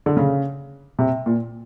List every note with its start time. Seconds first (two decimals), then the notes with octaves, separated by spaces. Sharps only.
0.06 D3
0.17 C#3
0.99 C3
1.26 A#2